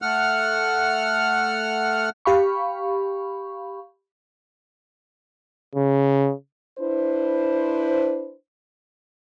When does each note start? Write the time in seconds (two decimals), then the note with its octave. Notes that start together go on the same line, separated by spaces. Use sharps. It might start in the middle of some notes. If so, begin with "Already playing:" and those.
0.02 A3 F#5 F6
2.25 G4 F5 B5 C#6
5.75 C#3
6.79 D4 E4 B4 C5